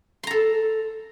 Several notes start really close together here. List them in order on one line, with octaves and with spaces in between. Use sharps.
C6 A#5 A4